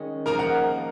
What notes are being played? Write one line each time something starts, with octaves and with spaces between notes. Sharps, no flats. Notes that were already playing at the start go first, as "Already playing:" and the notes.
Already playing: D#3 G#3 C#4 G#4
F3 A#3 D#4 G#4 A#4 A#5
F#5